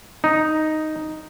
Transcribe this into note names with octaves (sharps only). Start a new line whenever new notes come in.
D#4